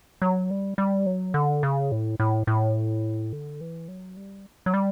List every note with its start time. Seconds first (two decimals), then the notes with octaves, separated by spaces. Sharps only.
0.22 F#3
0.51 G3
0.78 G3
1.06 F#3
1.34 D3
1.63 C#3
1.92 A2
2.20 A2
2.47 A2
3.33 D3
3.61 E3
3.88 F#3
4.17 G3
4.66 F#3
4.74 G3